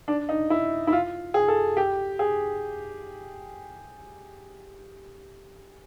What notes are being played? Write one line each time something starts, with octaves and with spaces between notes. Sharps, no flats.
D4
D#4
E4
E4
F4
G#4
A4
G4
G#4